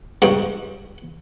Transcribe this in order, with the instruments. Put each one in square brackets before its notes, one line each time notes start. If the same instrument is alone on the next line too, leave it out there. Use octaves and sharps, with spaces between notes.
[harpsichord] C#2 G2